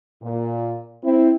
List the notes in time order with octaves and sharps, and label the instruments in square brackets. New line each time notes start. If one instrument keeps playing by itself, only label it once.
[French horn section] A#2
C4 E4